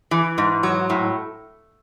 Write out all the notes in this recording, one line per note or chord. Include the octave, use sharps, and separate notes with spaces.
E3
G#2
F#3
A2